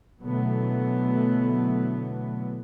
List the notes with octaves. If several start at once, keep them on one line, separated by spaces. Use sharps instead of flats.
B2 D3 E3 F#3 A3 B3